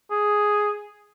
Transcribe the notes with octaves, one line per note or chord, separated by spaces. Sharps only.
G#4